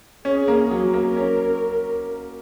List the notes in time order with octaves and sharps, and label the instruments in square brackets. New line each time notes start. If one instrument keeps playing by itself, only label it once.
[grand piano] C#4 [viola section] G#4
[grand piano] A#3
F#3
[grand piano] A#3 [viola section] A#4
[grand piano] C#4